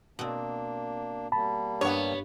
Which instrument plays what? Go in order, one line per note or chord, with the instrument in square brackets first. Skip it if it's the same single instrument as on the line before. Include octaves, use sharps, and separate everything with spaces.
[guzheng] B2 C4 [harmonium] A#3 D4
[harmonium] G3 A#3 [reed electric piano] A5 B5
[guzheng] G2 [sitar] B3 C#5